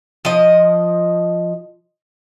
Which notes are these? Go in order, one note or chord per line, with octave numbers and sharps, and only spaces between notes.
F3 D#5